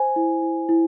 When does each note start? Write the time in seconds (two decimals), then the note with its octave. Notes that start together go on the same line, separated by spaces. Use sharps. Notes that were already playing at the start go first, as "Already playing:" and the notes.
Already playing: C5 G#5
0.16 E4
0.42 E4
0.69 E4